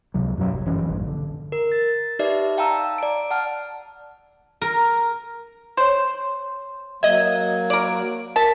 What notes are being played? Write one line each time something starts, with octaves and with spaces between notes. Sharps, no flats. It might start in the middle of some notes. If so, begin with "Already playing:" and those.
C#2 C3 F#3
F#2 B2 D#3 F#3
G1
G1 F#2 E3 C#4
F1 A#1 G2
D3
A#4
A6
D#4 G4 B4 D5 E5
F5 G5 A5 A#5 E6
D5 D7
F#5 A5 F6
A#4
C5 C#5 C6 E7
F#3 A#3 D#5 E5 G#6
A#4 D5 D7
A#4 A5 A6 B6